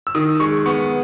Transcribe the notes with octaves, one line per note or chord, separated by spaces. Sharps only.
E6
D#3 D#6
G#3 C#6
B3 C#6